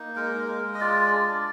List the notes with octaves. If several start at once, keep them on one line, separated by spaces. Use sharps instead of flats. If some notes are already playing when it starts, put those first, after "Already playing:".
Already playing: A#3 D#4
G#3 A#4
G#3
D#5
F4 D5
D4